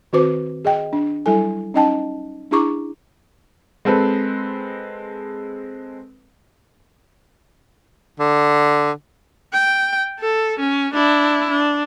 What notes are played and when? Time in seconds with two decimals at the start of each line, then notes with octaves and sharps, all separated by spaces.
0.13 D#3 C4 F#4 B4 C5 D6
0.65 G#4 D#5 G5
0.93 D4
1.26 F#3 G3 E4 A4 G#5
1.74 C#4 D#4 D#5 G5 A5
2.51 D4 E4 G#4 A#5 C#6 D6
3.85 G#3 C4 A4 B4
8.20 D3
9.53 G5
10.20 A4
10.60 C#4
10.94 D4 E4
11.51 D4